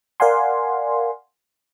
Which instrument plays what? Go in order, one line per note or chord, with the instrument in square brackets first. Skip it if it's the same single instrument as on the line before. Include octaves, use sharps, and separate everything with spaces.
[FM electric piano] A#4 D5 F5 F#5 G#5 C6